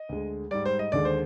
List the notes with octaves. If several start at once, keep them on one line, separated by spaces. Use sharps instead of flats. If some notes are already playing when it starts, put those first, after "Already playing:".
Already playing: D#5
D2 D3 G#3
G#2 G3 D5
C5
D#5
D#2 D3 G#3 D5
C5